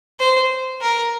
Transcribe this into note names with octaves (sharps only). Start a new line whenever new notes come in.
C5
A#4